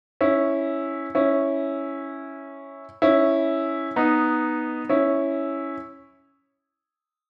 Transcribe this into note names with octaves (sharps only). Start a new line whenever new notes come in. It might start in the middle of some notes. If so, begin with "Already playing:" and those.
C#4 E4
C#4 E4
C#4 E4
B3 D#4
C#4 E4